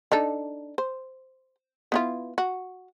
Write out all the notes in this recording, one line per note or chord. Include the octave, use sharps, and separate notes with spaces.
D4 D#4 A4
C5
B3 E4 F4
F#4